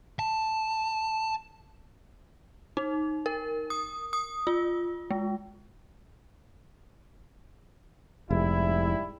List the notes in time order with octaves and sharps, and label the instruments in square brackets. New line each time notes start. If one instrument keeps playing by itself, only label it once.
[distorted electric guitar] A5
[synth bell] D#4
A#4
D#6
D#6
F4
G#3
[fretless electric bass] F1 [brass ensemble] G#2 G3 E4